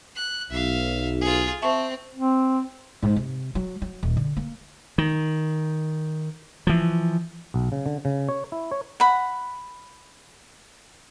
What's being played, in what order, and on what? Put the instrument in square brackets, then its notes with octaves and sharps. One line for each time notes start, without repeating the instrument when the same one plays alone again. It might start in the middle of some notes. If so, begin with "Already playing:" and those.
[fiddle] F#6
[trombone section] B1 [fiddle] E5 F5
[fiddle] F4 G#4
[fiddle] C4 [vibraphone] E5 A5 C#6
[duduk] C4
[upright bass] G#2
C3
F#3
F#3
D#1
D3
A#3
[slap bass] D#3
E3 F3
[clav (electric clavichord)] B1
C#3
D3
C#3
C#5
E4
C#5
[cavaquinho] F#5 B5